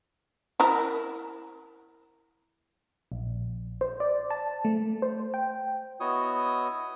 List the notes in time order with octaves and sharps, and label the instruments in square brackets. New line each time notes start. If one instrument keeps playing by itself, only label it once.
[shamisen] E4 A#4
[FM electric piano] A#1
C5
D5
A5
A3
C5
G5
[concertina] B3 E4 F#4 C#5 D#5 D#6